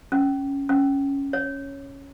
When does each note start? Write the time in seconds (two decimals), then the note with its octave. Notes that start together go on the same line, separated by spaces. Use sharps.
0.12 C#4
0.69 C#4
1.33 C#5